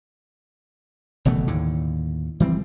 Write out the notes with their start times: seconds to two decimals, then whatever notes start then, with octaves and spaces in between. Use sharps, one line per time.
1.25 F#1 B2 E3 A3
1.47 D#2 A2 D3
2.40 E3 G3 G#3 C4